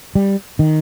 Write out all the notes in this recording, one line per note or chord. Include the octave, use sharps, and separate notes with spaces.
G3
D#3